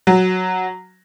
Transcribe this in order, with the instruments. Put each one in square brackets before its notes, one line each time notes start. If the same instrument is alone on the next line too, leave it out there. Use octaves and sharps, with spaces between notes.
[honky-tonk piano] F#3